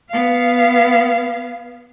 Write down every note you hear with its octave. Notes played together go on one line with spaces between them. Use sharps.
B3 F5